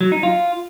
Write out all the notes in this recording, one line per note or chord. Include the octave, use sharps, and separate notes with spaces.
F#3
D#4
F4